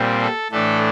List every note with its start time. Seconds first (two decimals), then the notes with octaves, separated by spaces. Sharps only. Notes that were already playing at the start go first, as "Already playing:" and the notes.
Already playing: A#2 G3 C4
0.21 A4
0.51 A2 E3 A3 D4 A4